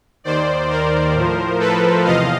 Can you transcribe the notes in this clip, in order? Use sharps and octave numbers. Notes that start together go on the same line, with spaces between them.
D#2 D#3 C5 D5
A#4 C5
A2 F3
A4 B4
E2 C3 F3 D#5 F5